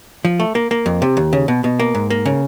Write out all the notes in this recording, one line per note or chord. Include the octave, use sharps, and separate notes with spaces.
F3
A3
A#3
A#3
F2
C3
D#2
C#3
B2
B2
A#3
G#2
A#3
C#3